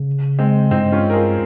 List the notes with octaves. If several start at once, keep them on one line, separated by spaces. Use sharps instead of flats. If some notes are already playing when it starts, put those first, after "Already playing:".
Already playing: C#3
G#3 C4
G2 C4 D#4
C#4 F4
A#4
F4 G#4